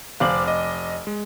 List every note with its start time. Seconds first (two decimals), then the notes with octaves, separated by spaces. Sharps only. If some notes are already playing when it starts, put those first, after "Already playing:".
0.20 F1 C5 F5 D6 F#7
0.48 D#5
1.07 G#3